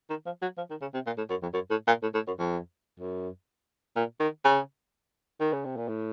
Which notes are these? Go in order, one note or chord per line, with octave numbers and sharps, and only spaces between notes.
D#3
F3
F#3
F3
D#3
C#3
C3
A#2
A2
F#2
F2
F#2
A2
A#2
A2
A2
F#2
F2
F#2
A#2
D#3
C#3
D#3
C#3
C3
A#2
A2